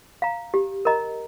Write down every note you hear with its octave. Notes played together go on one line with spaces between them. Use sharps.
F5 A#5
G4
A#4 D#5 A#5